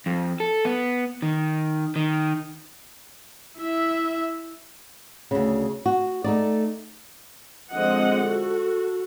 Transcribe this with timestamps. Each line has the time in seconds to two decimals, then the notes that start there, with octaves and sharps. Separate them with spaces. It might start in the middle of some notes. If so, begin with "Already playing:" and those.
0.06 F2
0.40 A4
0.65 B3
1.22 D#3
1.96 D#3
3.59 E4 E5
5.31 D2 C#3
5.86 F#4
6.24 A3 D#4 D5
7.71 D3 F3 G#3 C4 D#5 F#5
8.26 F#4 A4